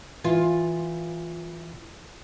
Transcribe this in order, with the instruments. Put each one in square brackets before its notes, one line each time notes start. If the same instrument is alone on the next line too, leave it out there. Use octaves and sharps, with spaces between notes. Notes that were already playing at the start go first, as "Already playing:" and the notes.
[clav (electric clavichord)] E3 [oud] F4